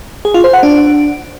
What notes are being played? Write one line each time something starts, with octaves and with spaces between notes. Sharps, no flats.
G#4
F4
C5
F#5
D4